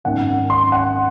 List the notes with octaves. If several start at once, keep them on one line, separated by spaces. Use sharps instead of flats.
G#1 F#2 D#3 F#5
C6
F#5